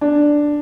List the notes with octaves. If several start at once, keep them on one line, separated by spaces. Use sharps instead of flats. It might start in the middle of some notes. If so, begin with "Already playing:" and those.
D4